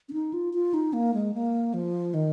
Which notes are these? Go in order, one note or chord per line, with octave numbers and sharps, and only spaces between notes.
C#4
D#4
F4
F4
D#4
A#3
G#3
A#3
F3
D#3